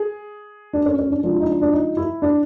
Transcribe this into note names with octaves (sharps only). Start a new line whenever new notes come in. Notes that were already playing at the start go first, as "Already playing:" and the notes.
Already playing: G#4
D4
C#4
C#4
D4
C#3 F3 G#3 D4
E4
D#4
D4
D4
D#4
E4
D4